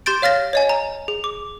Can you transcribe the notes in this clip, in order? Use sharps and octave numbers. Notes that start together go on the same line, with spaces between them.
G4 C6 G6 A6 D7
C#5 F5 F6 A6 A#6
C#5 D#5 G#5
A#5
G#4
D6